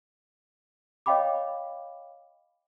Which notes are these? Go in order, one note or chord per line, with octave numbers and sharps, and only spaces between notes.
C#5 D#5 F5 G5 B5 D6